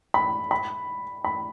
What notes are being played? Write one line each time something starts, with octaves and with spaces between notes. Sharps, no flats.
B5
B5
B5